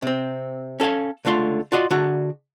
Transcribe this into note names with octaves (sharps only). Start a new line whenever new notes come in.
C3 C4
C#4 A4 D5 F5 G#5
C#2 D3 A3 F4 C6
F4 F#4 D5 D#5 C6
D3 D4 F#4 G#4